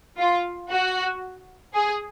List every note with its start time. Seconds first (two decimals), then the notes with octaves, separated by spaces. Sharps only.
0.19 F4
0.71 F#4
1.74 G#4